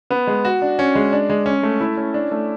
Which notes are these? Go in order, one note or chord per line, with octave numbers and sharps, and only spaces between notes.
B3
G#3
F#4
D4
C#4
G#3
D4
G#3
C#4
A3
E4
C#4
D4
A3